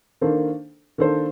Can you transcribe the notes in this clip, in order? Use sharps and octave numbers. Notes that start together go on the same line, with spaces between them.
D#3 A#3 D4 A4 C5
D#3 A#3 D4 A4 C5